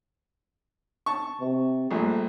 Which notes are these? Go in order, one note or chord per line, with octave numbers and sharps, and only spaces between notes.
A5 C#6
C3
A#1 G2 A#2 A3